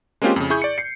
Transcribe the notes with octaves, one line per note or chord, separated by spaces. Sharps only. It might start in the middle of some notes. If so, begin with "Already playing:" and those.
G#3 A#3 C4 C#4 F4 G4
F2 C#3
E4 G#4 C#6 G6
D5 C#7
C7 C#7